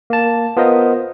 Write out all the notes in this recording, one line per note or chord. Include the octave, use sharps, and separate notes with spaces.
A#3 A5
B3 F4 A#4 C5 D#5